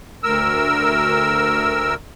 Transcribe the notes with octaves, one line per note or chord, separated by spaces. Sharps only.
D2 A#4 E6